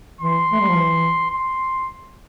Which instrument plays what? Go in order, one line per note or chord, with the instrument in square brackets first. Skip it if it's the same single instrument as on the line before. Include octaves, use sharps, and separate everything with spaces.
[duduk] E3 [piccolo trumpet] C6
[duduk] A3
G3
F3
E3
[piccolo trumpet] C6